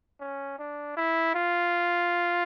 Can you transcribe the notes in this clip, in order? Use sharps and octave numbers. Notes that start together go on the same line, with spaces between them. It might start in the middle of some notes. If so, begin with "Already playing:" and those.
C#4
D4
E4
F4